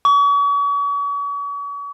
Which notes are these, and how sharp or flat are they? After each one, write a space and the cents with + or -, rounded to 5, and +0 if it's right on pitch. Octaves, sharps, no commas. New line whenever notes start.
C#6 +40